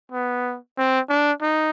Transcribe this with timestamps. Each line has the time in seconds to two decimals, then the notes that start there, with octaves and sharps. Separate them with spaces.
0.12 B3
0.77 C4
1.09 D4
1.42 D#4